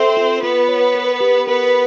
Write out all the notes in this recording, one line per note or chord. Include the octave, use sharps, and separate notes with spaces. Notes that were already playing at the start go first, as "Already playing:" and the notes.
Already playing: C4 A4 C5 E5
F4
B3 F4 B4
C#5
A#4
G4
B3 A#4 B4